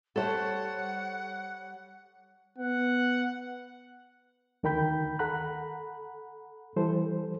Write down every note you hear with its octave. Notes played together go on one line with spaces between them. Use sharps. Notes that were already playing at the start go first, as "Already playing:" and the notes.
G3 A4 C5 C#5 F#5
B3 F#5
D2 D#3 A#4 G5 B5 G6
A4 F#5 A#5 B5 F#6
E3 G3 A4 C5